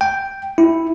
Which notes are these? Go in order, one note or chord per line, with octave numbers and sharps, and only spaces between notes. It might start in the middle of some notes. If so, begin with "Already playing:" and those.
G5
E4